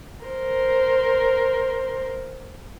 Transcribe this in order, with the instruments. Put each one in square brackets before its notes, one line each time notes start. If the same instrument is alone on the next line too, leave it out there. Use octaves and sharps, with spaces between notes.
[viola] A#4 C5